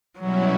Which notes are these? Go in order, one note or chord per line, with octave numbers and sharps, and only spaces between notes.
B2 F#3 G3 C#4 E4